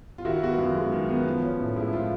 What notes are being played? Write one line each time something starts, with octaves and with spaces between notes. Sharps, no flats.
F4
D#3 E4 F#4
B3 F#4
F4
F#2
G#3
D#3
B3
F3
C#4
A2
G#3 E4
F3 F4